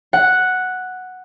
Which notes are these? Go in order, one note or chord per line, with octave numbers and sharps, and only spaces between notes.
F#5